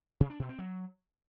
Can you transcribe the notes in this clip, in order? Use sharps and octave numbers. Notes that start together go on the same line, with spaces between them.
C3
D4
B2
C4
F#3